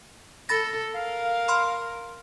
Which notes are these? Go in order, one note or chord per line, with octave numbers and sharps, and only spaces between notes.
A4 B5 A6 A#6
A#4 F5
B5 C6 F6